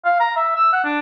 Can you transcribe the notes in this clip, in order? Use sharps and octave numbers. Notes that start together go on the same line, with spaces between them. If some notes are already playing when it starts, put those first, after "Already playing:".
F5
A#5
E5
E6
F#5
D4